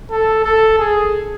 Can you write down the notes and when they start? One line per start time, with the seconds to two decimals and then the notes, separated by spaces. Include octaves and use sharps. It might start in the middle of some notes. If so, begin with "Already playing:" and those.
0.11 A4
0.45 A4
0.78 G#4